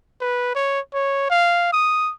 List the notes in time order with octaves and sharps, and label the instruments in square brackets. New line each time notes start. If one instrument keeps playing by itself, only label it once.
[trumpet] B4
C#5
C#5
F5
D#6